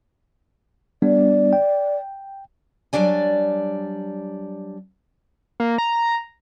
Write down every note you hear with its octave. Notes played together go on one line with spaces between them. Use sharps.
G3 B3 D4 D5
G5
F#3 G3 D4 D5 G#5
A#3
A#5